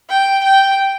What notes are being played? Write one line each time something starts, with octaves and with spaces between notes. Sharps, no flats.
G5
G5